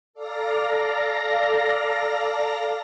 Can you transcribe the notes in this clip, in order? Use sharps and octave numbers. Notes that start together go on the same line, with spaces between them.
A4 D5 F5 A#5 A#6